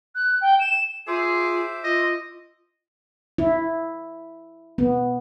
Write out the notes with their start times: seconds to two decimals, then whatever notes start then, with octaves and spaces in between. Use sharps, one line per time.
0.15 F#6
0.41 G5
0.60 E7
1.07 F4 G#4 C5 E5 D6
1.84 F4 D#5
3.38 E4
4.78 B3